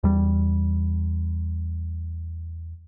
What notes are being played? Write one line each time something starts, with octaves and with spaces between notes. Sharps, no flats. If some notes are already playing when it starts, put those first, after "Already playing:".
E2 G3